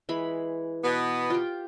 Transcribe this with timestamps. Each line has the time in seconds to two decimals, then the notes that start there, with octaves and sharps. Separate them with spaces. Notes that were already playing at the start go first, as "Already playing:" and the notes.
0.09 E3 G#3 B5
0.84 B2 B3
1.30 F4 G4